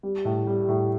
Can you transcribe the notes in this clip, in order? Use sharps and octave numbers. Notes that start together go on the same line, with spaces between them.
G3
A2
G3
A2